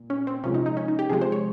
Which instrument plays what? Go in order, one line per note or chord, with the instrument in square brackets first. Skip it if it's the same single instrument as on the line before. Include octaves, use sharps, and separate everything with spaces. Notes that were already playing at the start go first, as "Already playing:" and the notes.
Already playing: [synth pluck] A#2
C#4
C4
C3 F3 G#3 C#4
D#4
D#4
C#4
D#4
G4
C3 F3 G#3 G#4
C5
C#5